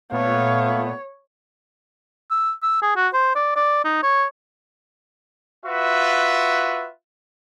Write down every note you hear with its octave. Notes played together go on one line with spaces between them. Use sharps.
A#2 A3 B3 C#5 F5
E6
E6
G#4
F#4
C5
D5
D5
D#4
C#5
F4 F#4 B4 E5